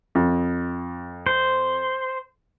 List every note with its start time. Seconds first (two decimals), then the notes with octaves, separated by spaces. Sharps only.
0.15 F2
1.27 C5